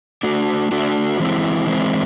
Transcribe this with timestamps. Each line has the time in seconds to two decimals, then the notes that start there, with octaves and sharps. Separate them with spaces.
0.23 A3 D4 F#4
0.72 A3 D4 F#4
1.19 E3 G#3 C4 E4
1.66 E3 G#3 C4 E4